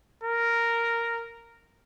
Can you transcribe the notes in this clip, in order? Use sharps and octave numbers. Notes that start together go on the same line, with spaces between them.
A#4